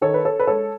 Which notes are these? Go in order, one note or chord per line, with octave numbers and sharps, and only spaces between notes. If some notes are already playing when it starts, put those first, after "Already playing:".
D#3 A4 C#5
B4
A4 C#5
B4
G#3 A4 C#5